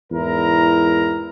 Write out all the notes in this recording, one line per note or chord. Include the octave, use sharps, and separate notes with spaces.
E2 G#2 E4 A#4 A#5